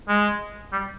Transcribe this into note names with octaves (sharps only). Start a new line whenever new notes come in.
G#3
G3